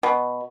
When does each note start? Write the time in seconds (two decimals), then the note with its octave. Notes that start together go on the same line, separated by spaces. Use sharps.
0.03 B2